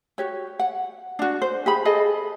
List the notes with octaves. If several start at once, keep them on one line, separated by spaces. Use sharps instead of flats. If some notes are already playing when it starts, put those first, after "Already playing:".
F#4 G4 C#5
F#5
D4 F#4
C5
G4 G#4 B5
G#4 A4 D#5